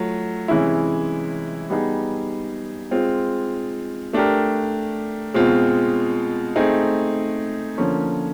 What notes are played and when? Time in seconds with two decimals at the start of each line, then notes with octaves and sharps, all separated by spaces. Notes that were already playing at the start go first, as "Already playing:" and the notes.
Already playing: F#3 A3 F4
0.48 C3 E3 G#3 C#4 E4
1.70 G3 B3 D#4 G#4
2.91 G#3 C4 F4
4.13 A3 D4 G4 A#4
5.34 B2 G#3 C4 F4
6.56 A3 C4 D#4 G#4
7.78 D3 F3 A#3 C#4